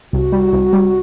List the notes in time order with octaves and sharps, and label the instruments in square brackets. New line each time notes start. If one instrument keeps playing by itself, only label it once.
[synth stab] C2 [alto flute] F#4
[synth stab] G3
C2
G3